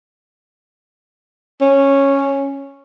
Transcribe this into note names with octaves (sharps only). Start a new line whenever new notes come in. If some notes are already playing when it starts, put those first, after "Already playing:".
C#4